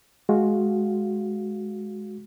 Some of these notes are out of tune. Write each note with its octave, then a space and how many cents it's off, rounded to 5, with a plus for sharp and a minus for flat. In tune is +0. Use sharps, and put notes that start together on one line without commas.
G#3 +15 F#4 +0 F5 +0